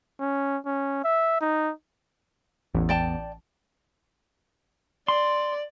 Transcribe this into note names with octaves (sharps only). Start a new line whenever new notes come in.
C#4
C#4
E5
D#4
A1 E2
D5 G5 A5
D5 C6